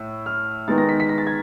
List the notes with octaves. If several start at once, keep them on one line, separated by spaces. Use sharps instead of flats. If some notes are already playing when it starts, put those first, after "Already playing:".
Already playing: A2 E6
F6
D#3 G#3 B3 D#4 A6
A#6
B6
B6
A#6
A6
G#6